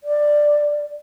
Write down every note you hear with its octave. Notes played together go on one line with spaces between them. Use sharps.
D5